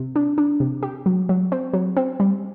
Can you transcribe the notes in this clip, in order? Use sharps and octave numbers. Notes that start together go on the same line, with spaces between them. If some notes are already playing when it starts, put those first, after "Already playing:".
Already playing: C3
D4
D4
C3
G4
F#3
F#3
C4
F#3
C4
G3